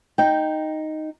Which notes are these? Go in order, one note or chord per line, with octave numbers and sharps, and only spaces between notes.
D#4 G5